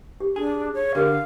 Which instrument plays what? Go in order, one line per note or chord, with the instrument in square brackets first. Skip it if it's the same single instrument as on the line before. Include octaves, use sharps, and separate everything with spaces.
[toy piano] G4
[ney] D4 [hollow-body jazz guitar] G#4
[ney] C#5
[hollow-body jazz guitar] D3 [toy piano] G4 A#4 [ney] F5